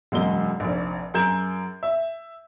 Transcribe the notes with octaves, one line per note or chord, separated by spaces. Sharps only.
E1 F#2 G#3 G7
F1 A#1
F#2 G#4 A#4 G6 G#6 E7
E5